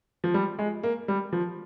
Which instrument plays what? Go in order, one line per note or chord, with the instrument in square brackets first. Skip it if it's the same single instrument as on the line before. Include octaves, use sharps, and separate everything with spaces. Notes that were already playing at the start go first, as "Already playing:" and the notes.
[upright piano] F3
G3
G#3
A#3
G3
F3